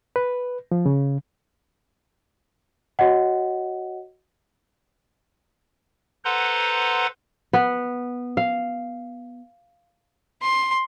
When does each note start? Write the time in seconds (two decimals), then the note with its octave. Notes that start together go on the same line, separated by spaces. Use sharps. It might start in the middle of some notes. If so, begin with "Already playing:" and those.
0.16 B4
0.72 F3
0.86 C#3
2.99 F#4 C#5 D#5 F#5
6.25 A4 B4 C5 F#5 A#5 C6
7.53 B3
8.37 F5
10.42 C6